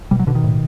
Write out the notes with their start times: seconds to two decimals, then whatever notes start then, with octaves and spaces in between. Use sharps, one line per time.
0.11 B2 G3
0.19 F#3
0.27 B2 D3
0.35 D#3
0.44 A2